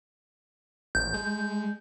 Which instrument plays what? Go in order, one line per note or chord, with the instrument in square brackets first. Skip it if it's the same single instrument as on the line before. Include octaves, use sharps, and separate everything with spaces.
[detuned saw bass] A1 [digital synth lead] G6
[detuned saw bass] G#3